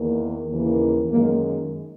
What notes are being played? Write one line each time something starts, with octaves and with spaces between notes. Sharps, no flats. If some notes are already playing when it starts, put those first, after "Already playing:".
Already playing: E2 D#3 A#3
D#2 C#3 E3 A#3
F#2 D#3 G#3 A#3